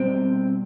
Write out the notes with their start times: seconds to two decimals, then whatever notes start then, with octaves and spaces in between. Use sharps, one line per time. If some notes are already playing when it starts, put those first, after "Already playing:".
Already playing: B2 G3 C4